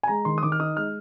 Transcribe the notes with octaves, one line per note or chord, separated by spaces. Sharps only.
G#5
G#3 A#5
D#3 C6
D#6
D#3 D6
F6
D#4 D#6
G#3 F6